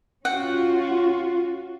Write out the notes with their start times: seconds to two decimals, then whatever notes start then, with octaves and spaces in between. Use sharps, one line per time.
0.25 C#4 F4 F#4 F#5 G5